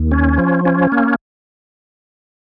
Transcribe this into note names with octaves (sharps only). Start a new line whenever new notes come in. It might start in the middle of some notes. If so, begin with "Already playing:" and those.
Already playing: D#2
C#4
F3
C#4
A#3